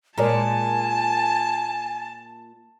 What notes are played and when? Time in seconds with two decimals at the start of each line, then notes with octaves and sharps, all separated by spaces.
0.18 A#2 G#3 A#4 D5 G#5 A5